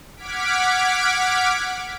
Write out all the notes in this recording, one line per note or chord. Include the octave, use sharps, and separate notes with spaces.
F#5 D6 F6 G#6 B6 D7